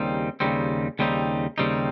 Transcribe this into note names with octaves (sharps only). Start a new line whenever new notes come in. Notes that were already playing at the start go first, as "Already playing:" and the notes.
Already playing: D#2 C#3 G3 C4 D#4
D#2 C#3 G3 C4 D#4
D#2 C#3 G3 C4 D#4
D#2 C#3 G3 C4 D#4